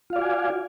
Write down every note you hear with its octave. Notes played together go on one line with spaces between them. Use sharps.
F4 F#4 D5 F5 G#5